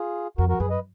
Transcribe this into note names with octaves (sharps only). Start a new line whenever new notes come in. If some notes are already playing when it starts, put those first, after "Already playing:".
Already playing: F4 G#4
F2 F#4 A#4
F#4 A#4
F#2 G#4 B4
B4 D#5